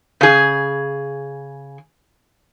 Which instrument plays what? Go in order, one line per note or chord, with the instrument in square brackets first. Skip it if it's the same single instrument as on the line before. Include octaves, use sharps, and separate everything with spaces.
[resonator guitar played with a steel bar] C#3 G#4